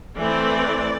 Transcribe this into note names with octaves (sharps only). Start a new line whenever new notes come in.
E3 A3 C4 D5